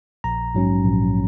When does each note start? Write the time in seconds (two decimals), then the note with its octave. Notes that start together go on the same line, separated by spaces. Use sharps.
0.24 A#1 A#5
0.55 G#2 F#3 C#4
0.84 A#1